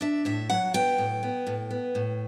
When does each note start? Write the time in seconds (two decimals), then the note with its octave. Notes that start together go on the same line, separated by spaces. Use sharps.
0.01 D4 E5
0.25 A2 E5
0.50 F#3 F#5
0.74 B3 G5
0.98 A2
1.23 B3
1.47 A2
1.71 B3
1.95 A2